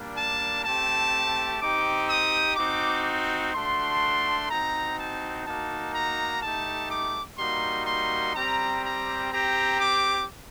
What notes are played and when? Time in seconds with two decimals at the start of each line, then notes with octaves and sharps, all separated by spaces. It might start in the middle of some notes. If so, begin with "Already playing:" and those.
Already playing: G3 A#3 D4
0.15 A5
0.64 A3 C4 G4 A5
1.60 C4 D#4 G4 D6
2.09 D#6
2.56 C4 D#4 F#4 D6
3.52 A3 D4 F#4 C6
4.49 C4 D#4 F#4 A#5
4.97 A5
5.46 A#3 D#4 F#4 A5
5.93 A#5
6.42 A3 D#4 G4 A5
6.90 D6
7.38 G3 A#3 D#4 F#4 C6
7.86 C6
8.35 G3 C4 G4 A#5
8.83 A#5
9.30 C4 G4 A#5
9.79 D6